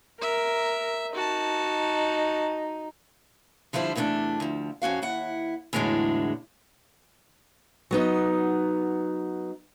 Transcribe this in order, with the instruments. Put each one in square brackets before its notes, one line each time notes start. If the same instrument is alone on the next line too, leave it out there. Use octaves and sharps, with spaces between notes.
[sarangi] A#4 [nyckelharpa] E5
[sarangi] D#4 [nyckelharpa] F#4 A5
[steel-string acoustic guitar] D3 F3 G3 E4 C5
E2 C3 A3 C4 D4
D2 F3
F2 C#4 F#4 F5
D#2 E4 F#5
E2 A2 D3 F#3 G#3 D4
F#3 B3 D#4